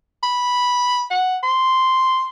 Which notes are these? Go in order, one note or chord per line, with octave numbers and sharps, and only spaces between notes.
B5
F#5
C6